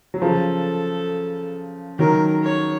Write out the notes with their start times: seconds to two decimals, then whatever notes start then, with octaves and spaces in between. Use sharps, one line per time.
0.14 F#3
0.22 C#3 F3 A4
1.99 D#3 F#3 A#4
2.43 C#5